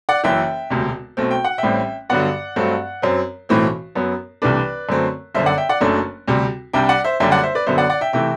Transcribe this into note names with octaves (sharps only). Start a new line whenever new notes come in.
D5 F#5
F#1 F#2 E3 E5 G5
E1 D2 C3
B1 B2 A3 C4
G5
F#5
E5 G5
A1 A2 G3 C4
G2 D3 F#3 B3 D5 F#5
G2 F#3 A3 C4
F#2 F#3 C4
B1 A2 E3 A3 C4
F#2 F#3 B3
C2 C3 E3 A3 D4 B4 D5
F#2 D3 F#3 A3 C4
G1 F#2 D3 C5 E5
D5 F#5
E5 G5
D5 F#5
F#1 F#2 F#3 A3 D4
D2 C3 G3
C2 C3 G3 D4 E5 G5
D5 F#5
C5 E5
F#1 F#2 D3 G3 D4 E5 G5
D5 F#5
C5 E5
B4 D5
F#2 D3 F#3 B3 C5 E5
D5 F#5
D5 F#5
E5 G5
C3 E3 A3 E5 G5